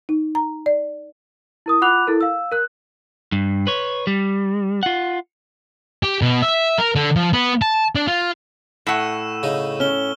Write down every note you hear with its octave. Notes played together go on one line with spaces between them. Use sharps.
D#4
A#5
D5
E4 A#4 D#6
F4 F#5 B5 D6 F#6 F7
E4 A4 A#4
F5 E6
A#4 F#6
G2
B4 C#5
G3
F4 F#5
G4
B2
E5
A#4
D3
F3
B3
A5
D4
F4
A2 F#5 C#6 E6 E7
C#3 D#4
C#4 F6 G7